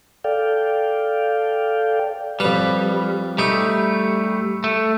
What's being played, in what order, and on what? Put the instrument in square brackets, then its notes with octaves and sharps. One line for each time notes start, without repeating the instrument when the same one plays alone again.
[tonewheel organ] A4 D5 F5 G5
[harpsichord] F2 B4 [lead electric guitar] G3
[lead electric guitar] G3 A3 [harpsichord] D#4
[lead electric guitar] A3